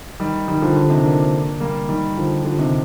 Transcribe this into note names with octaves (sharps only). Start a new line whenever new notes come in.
D#3 G3
D#3 G3
D3 F3
D3 F3
C3 D#3
A#3 D4
G3 A#3
D#3 G3
D3 F3
D3 F3
C3 D#3